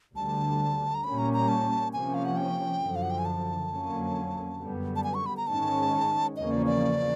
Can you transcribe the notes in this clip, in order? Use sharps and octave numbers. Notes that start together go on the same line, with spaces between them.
D2 D3 G3 A5
A#5
A#2 G3 A#3 C#4 B5
A#5
A#5
A5
C3 F3 A#3 C#4 G#5
F5
F#5
G5
F#2 D3 F3
F5
F#5
G5
G#5
A5
F2 D3 F#3 A#3 C#4
F#2 D3 G3 B3
A5
G#5
C#6
B5
A#5
G#2 D#3 G#3 C#4 A5
E2 C#3 F3 A#3 C#4 D#5
D5
D5